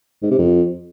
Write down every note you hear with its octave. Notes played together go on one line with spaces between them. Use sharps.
G#2
C3
F2